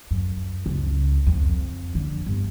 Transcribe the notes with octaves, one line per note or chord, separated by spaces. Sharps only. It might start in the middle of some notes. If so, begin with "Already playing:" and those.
F#2
C#2
F2
D3
G1